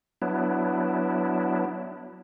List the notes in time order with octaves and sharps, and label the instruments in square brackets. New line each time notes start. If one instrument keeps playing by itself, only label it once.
[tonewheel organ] F#3 B3 D4 E4